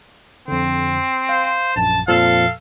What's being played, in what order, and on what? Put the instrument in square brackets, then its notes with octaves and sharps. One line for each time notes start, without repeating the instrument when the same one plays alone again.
[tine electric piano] F2 D3 [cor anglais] C4
[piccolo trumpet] C5 [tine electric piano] F5
[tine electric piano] A#1 F#2 [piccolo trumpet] A5
[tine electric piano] F2 A#2 F3 [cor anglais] A4 [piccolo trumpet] F5